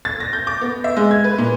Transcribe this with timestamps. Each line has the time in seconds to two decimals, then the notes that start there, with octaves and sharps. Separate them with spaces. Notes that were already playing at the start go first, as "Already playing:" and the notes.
0.05 A6
0.20 A#6
0.33 G6
0.47 D6
0.61 B3
0.84 E5
0.97 G#3
1.11 G#6
1.24 B4
1.38 A#2